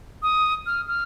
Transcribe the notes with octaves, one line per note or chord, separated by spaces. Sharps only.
D#6
F6
F6